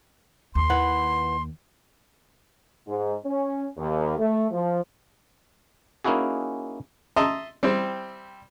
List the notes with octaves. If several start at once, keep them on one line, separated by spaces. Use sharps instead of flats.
D#2 C6
E4 B4 F#5
G#2
C#4
D#2
A3
F3
A#3 C#4 D#4 E4 F#4 G#4
D#5 E5 A5 A#5 C6
G3 C4 E4 C5